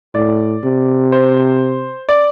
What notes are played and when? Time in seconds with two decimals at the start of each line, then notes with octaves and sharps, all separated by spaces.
0.15 A2 D5
0.64 C3
1.12 C5
2.09 D5